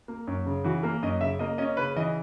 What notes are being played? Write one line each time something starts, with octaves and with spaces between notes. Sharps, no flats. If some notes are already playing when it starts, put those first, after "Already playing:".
A#3
F#2
C#3
E3 F#4
A#3 A#4
F#2 D#5
C#3 E5
A#3 D#5
C#4 D#5
C#3 B4
E3 D#5